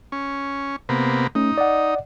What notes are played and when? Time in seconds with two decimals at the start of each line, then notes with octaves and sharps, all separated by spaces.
0.12 C#4
0.89 C3 A#3 B3
1.35 A3 C#4 D#4
1.58 D5 D#5 F#5